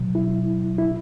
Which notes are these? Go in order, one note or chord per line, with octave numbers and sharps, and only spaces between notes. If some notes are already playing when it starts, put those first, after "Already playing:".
Already playing: B2 F#3
E4
E4